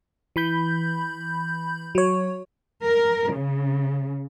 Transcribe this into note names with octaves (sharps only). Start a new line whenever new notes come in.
E3 B5 G6
F#3 C#5
A#4
C#3